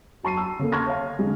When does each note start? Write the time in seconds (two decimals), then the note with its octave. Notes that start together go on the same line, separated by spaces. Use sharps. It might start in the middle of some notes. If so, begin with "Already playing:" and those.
0.23 F#3 A5 C#6 C7 D#7
0.37 E6
0.59 C#3 A#3 A4
0.72 A5 C6 C#6 F6 G#6 A#6
0.86 C#5 F5
1.19 D3 G#3